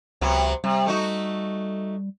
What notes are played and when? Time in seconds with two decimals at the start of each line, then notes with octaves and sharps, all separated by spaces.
0.21 C#2 C3 F#3 B3
0.64 C3 G3
0.86 A3 D#4 F#4